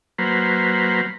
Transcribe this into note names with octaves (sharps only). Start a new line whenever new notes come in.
F#3 A#3 B4 C5